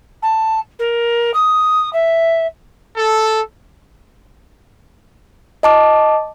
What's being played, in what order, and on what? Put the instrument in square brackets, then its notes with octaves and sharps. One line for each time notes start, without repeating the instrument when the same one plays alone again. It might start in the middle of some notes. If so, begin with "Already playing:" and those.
[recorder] A5
A#4
D#6
E5
[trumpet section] A4
[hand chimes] D#5 A5 D6